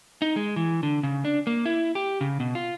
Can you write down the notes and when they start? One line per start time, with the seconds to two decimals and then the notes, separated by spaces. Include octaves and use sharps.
0.22 D#4
0.36 G#3
0.56 E3
0.83 D3
1.03 C#3
1.25 D4
1.47 A#3
1.66 E4
1.95 G4
2.21 C#3
2.40 B2
2.55 F4